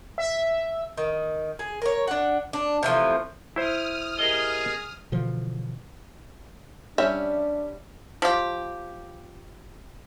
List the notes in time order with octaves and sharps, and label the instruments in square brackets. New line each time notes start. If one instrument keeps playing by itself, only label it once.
[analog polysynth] E5
[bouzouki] D#3
G#4
A#4 C#5
D4 F#5
D4
C3 E3 F3 A3
[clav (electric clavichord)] E4 C5 [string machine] D#6 F6
[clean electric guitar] G4 A#4 D#5 [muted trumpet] G#4
[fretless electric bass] B2 D3 E3 F3
[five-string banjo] G3 C#4 G4 [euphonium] D4 [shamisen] E5
[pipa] F3 G4